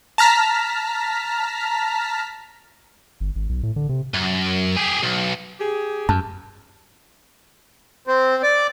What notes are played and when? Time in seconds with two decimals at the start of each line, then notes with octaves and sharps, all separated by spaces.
0.18 A5 A#5 F6 B6
3.20 G1
3.36 G#1
3.49 B1
3.63 A2
3.76 D3
3.89 C3
4.14 F#2
4.76 G4 G#4
5.03 B1
5.60 G4 G#4
6.09 F#2 A5
8.07 C4
8.43 D5